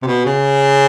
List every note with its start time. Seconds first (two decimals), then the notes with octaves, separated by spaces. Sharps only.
0.02 C3
0.07 B2
0.26 C#3